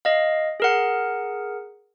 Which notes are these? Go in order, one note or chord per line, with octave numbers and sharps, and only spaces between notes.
D#5 F5
G#4 A#4 F#5